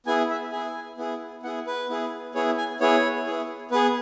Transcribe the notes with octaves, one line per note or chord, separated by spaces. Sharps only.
B3 E4 G#4 G#5
E5
B3 E4 G#4 G#5
B3 E4 G#4
B3 E4 G#4 F#5
B4
B3 E4 G#4
B3 E4 G#4 C#5
G#5
B3 E4 G#4 C#5
B3 E4 G#4
B3 G#4 B4